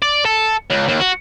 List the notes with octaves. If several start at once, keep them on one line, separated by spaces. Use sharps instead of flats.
D5
A4
C#2
D#2
F#4